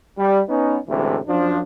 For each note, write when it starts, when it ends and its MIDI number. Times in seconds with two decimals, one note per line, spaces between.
0.18 0.41 55
0.49 0.78 59
0.49 0.78 61
0.49 0.78 63
0.88 1.18 33
0.88 1.18 38
0.88 1.18 45
0.88 1.18 48
0.88 1.18 52
0.88 1.18 56
1.27 1.60 42
1.27 1.60 53
1.27 1.60 62